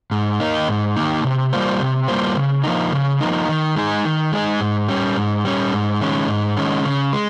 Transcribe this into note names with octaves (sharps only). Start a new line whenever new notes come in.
G#2
D#3 A#3 D#4
G#2
D#3 A#3 D#4
C3
G3 A#3 F4 C5
C3
G3 A#3 F4 C5
C#3
F3 A#3 D#4
C#3
F3 A#3 D#4
D#3
G#3 D#4 G#4
D#3
G#3 D#4 G#4
G#2
G3 C#4
G#2
G3 C#4
G#2
D#3 G#3 C#4
G#2
D#3 G#3 C#4
C#3
G#3